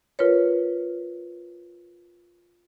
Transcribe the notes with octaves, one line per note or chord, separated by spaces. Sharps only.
F4 A#4 B4 C#5